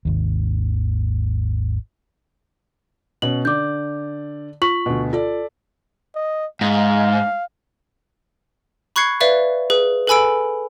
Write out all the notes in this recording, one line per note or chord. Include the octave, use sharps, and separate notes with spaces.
G#1 D#2
B2 C#4 F#7
D3 D5 D6 G6
F4 C#6 B6 F#7
D2 B2
F4 A4 D5
D#5
G#2 F5
B5 C#6 F#6 G#6 C7 C#7
B4 D5 E5 F5
G#4 B4
A4 B4 G#5 B5 E6 D7